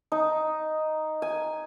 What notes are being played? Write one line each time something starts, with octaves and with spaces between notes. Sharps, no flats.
D#4
G#5